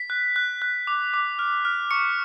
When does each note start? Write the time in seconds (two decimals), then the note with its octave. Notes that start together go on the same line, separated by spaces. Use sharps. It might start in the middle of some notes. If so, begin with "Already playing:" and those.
Already playing: B6
0.10 F#6
0.36 F#6
0.62 F#6
0.87 D6
1.14 D6
1.39 F6
1.65 F6
1.91 C#6 C#7